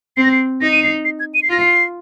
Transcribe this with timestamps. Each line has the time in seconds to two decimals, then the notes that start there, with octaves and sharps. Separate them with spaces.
0.17 C4 C7
0.24 A#6
0.32 C7
0.61 D#4 A#6
0.72 D#7
0.83 C7
1.05 C7
1.20 G#6
1.34 D#7
1.43 C7
1.49 F4 A#6
1.60 C7